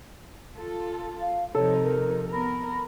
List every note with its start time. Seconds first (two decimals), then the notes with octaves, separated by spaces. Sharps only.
0.55 F4 A4
1.21 F5
1.55 C3 F3 D#4 A4 C#5
1.83 A#4
2.32 B3 A#4 B5